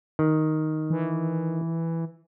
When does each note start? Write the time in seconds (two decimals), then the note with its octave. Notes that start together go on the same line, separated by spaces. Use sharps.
0.19 D#3
0.90 E3